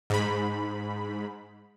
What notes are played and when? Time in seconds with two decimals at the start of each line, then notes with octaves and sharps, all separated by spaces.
0.10 G#2 B5